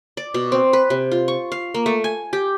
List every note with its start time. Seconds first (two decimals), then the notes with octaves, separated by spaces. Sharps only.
0.17 D5
0.34 B2
0.52 C4
0.73 B4
0.90 C3
1.12 F4
1.28 C#6
1.52 F5
1.74 A#3
1.86 A3
2.04 G#5
2.33 G4